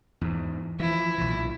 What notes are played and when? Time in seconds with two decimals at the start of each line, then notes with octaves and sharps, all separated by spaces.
0.21 E2 G#2
0.80 E3 F3 E4
1.18 B1 A#2